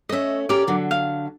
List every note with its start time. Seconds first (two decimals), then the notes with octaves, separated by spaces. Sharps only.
0.09 A3 C#4 D#5 E5
0.49 C#4 G4 A#4 D5 D6
0.67 D3 F#3
0.91 F5